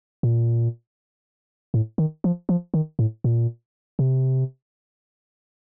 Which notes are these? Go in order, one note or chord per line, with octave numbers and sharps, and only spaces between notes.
A#2
A2
D#3
F3
F3
D#3
A2
A#2
C3